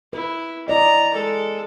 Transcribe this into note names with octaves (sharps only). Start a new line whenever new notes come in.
E4 B4
E4 D5 D#5 A#5
G#3 A4